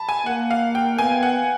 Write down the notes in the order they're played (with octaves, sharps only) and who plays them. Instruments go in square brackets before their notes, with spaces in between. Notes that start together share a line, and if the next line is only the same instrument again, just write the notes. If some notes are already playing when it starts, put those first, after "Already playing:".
Already playing: [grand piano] A5 B5
G#5
[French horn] A#3 [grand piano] F#5
[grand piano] F5
G5
[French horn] B3 [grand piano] G#5
[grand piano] F#5